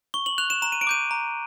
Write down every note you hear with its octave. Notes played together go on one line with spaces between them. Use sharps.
C#6 G7
F#7
F#6 F7
E7
A#5 E7
D#7
D7
D6 G6 D#7
A#5